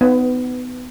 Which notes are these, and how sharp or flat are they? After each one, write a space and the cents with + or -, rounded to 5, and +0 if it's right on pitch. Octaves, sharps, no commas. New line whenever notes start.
B3 +25 D#4 +0